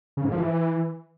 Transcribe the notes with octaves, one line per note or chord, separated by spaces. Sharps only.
C#3
G#2
F3
E3